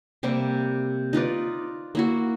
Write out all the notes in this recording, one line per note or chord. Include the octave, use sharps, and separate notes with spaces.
C3 G3 A#3 E5
D#4 F4 B4 D5
A#3 E4 F#4